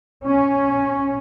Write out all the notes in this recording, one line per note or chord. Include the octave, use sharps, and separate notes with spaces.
C#4